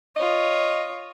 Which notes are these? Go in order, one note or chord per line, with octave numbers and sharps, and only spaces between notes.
F4 C#5 D#5